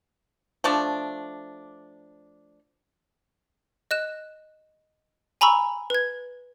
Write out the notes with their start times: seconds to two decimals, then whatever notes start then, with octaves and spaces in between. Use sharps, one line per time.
0.64 F3 A3 D4
3.91 D#5 F#6 E7
5.41 G#5 A#5 B5 C#6 E6
5.90 B4 G#6